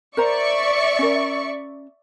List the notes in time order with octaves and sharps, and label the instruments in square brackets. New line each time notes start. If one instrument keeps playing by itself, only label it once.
[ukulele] A#4 C5 A#5 [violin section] D5 E5 C#6
[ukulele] C#4 A#4